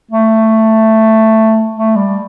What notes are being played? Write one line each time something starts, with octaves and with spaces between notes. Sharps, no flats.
A3
A3
G3